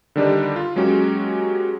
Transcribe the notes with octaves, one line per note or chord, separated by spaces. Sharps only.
D3 D#3 G3 D4 D#4 G4
F4
F#3 G#3 A#3 C#4 F#4 G4